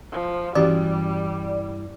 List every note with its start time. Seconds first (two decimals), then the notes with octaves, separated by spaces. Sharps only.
0.12 F3
0.55 G2 E3 G3 C#4 F#4 G4 D5